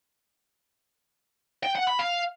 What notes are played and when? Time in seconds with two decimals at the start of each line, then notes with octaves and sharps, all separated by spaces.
1.63 G5
1.75 F#5
1.87 B5
1.99 F5